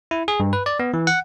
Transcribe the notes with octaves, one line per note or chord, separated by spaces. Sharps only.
E4
G#4
G2
B4
D5
B3
E3
F#5